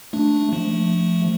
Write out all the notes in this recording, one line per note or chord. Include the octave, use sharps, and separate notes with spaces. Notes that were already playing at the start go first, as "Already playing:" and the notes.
A3 D4
F3 A3